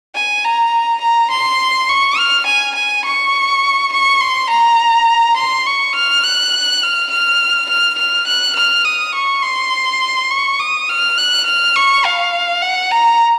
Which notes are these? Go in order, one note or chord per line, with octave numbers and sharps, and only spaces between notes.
G#5
A#5
A#5
C6
C#6
F6
G#5
G#5
C#6
C#6
C6
A#5
C6
C#6
F6
F#6
F6
F6
F6
F6
F#6
F6
D#6
C#6
C6
C#6
D#6
F6
F#6
F6
C#6
F5
F#5
A#5